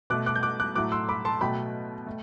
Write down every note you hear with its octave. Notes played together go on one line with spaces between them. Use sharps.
B2 A3 D6 F#6
D6 F#6
G6
D6 F#6
D6 F#6
A2 F#3 A3 D6 F#6
C6 E6
B5 D6
A5 C6
B2 F#3 A3 G5 B5
A3